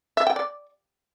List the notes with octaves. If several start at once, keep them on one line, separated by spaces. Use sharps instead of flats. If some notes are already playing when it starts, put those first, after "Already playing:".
E5
G5
D5